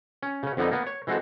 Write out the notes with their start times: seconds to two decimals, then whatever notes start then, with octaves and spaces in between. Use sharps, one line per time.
0.23 C#4
0.43 C#3 C#4
0.57 F2 D3 B3 D#4
0.71 A#3 B3
0.86 C#5
1.07 E3 G#3 C4 F#4 A4